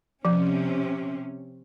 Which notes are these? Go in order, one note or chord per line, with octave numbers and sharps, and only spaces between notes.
C3 F3 C#4